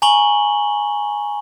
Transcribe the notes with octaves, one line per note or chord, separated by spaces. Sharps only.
G#5 A#5 C#6 F#7 G7